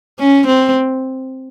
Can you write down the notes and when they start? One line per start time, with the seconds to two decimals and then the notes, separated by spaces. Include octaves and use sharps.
0.19 C#4
0.47 C4